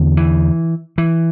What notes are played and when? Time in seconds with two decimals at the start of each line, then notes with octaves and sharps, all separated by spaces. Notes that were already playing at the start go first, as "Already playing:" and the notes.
Already playing: E2 D3
0.17 E3
0.98 E3